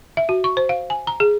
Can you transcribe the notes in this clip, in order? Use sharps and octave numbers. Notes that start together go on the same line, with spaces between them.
E5
F#4
C#6
C5
F5
G#5
A#5
G#4